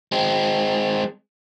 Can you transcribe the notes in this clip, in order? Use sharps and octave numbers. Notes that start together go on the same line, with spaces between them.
G#3 C4